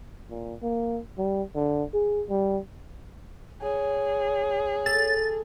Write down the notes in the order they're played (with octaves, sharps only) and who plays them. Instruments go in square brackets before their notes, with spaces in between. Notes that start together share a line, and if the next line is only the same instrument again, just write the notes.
[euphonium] A#2
A#3
G3
D3
G#4
G3
[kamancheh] G#4 [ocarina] C#5
[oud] A4 [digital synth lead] A6